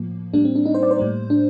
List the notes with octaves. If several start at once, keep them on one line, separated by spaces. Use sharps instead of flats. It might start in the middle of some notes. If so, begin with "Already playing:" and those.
Already playing: A2 F3 A#3
A2 G3 A#3 D4
C4
D4
D#4
C5
D5
C5
A2 G3 A#3
D4